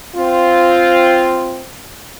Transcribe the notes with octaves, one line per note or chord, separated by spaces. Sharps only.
C4 F4